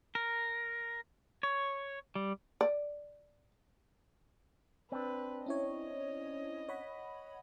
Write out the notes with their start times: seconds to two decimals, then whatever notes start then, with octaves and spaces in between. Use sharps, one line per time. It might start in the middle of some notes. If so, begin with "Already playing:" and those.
0.15 A#4
1.43 C#5
2.15 G3
2.61 D5
4.92 C4 D4 B4
5.46 C#4 E4 C#5 D#5
6.69 C#5 F#5 B5